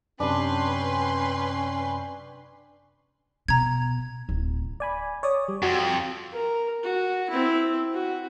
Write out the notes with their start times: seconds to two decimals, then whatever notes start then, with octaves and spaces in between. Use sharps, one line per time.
0.20 F#2 C3 C#4 D4 B4 G5 C6
3.48 B2 A#5 G#6
4.29 D1
4.80 D5 G#5 B5
5.23 C#5 D5 D#6
5.48 G3
5.63 F2 F#4
6.32 A#4
6.84 F#4
7.30 C4 E4
7.94 F#4